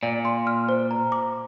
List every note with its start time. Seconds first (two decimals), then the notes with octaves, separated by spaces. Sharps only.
0.03 A#2 D5
0.25 C6
0.47 F6
0.69 C5
0.91 A#5
1.12 D6